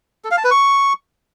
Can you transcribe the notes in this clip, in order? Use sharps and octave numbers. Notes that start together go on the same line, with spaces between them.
A4
F5
A5
B4
C#6